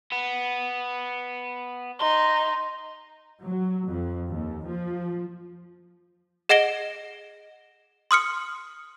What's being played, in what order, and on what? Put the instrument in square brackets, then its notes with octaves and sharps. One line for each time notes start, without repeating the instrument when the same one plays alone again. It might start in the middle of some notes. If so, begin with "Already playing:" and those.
[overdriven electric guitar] B3
[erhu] D#4 [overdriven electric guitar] C6
[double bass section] F#3
F2
D#2
F3
[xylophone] G#4 D#5 F#5 A#6 D7 G7
C6 D#6 F6 C#7